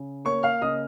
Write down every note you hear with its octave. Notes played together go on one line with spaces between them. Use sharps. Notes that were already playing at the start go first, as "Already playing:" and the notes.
Already playing: C#3
A#3 C#5 C#6
F5 F6
C#3 D#5 D#6